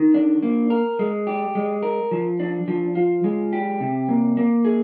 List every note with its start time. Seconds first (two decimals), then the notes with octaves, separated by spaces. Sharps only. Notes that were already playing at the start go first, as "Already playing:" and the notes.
Already playing: D#3
0.14 D4
0.42 A#3
0.70 A#4
0.99 G#3
1.27 G4
1.55 G#3
1.83 A#4
2.11 F3
2.40 D4
2.68 F3
2.95 F4
3.24 G#3
3.53 G4
3.80 C3
4.09 A#3
4.37 A#3
4.65 G#4